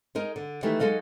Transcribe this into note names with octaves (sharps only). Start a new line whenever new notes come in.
G#3 D#4 A#4 D#5
D3
D#3 E3 G#3 A3 G4
F#3 G#3 D#4 A4 D#5 F5